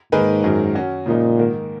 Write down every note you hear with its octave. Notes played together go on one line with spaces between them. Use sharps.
G#2 D#3 A#3 D#4 G#4 B4
F#2 D#3 F#3
F#3 C#4 F#4
A#2 C#3 F3 G#3 D#4
G#2 D#3 A#3